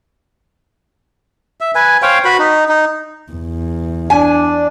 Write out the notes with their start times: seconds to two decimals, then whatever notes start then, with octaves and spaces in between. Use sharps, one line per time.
1.61 E5
1.75 B4 G#5
2.02 C5 C#5 F5 G5
2.25 F#4 B4 B5
2.39 D#4
2.69 D#4
3.32 E2
4.10 D4 G#5